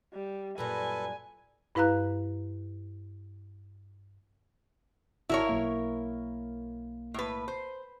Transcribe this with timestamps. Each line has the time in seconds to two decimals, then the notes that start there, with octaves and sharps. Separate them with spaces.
0.14 G3
0.58 F#2 A#2 G3 A4 B4 G#5
1.75 G2 E4 B4 F5 A#5 F#6
5.29 G#1 E4 F#4 A#4 C#5 D5
5.47 B1 A#3 F5
7.14 A2 B4
7.48 C5